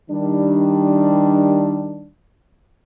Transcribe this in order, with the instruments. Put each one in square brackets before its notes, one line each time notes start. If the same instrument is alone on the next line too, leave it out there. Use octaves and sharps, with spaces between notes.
[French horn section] D#3 G3 D4